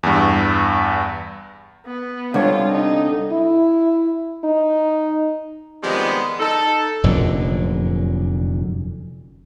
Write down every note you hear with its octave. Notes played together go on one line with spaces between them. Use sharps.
E2 G2
B3
C2 D3 G3 C4 F4 C#5
D#4
E4
D#4
C3 D#3 F3 G3 G#3 B3
D#4 A4
F1 F#2 A#2 D3